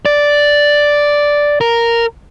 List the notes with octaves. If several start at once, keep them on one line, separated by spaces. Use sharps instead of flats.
D5
A#4